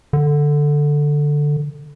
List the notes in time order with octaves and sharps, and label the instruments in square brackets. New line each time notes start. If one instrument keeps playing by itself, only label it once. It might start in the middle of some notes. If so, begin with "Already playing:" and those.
[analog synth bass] D3